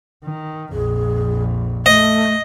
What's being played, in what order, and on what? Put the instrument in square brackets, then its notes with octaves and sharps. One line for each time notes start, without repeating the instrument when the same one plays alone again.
[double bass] D#3
[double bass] A#1 F2 [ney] G#4
[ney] A3 [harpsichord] D#5